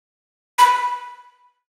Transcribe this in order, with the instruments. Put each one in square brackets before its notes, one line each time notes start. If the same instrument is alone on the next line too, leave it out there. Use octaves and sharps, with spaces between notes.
[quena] B5